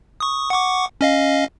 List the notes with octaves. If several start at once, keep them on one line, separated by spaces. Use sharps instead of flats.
C#6 D#6
F#5 C#6 D6
C#4 D#5 F5